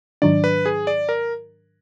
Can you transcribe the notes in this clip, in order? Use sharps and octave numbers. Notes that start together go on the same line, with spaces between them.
G#2 D#3 F#3 D4 D5
B4
G#4
D5
A#4